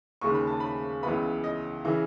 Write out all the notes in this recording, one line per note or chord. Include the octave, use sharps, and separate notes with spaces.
D#2 C#3 G#3 C#6
B5
A5
B5
C#2 C#3 E3 B3 B5
D#5
C#3 E3